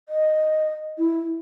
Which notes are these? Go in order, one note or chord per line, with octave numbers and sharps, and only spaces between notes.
D#5
E4